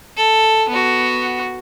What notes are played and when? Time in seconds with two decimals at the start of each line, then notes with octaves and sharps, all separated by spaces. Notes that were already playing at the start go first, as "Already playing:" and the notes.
0.17 A4
0.69 B3 F#4